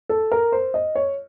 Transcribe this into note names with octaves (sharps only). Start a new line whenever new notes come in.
A4
A#4
C5
D#5
C#5